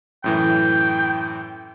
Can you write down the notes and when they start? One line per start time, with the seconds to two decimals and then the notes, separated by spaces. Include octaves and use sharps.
0.24 F#2 A2 E3 G5